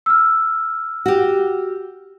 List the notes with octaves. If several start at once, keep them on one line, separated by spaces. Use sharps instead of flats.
E6 F6
F#4 G4